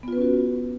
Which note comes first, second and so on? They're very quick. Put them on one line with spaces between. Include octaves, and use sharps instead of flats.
B3 F4 B4 C#4 F#4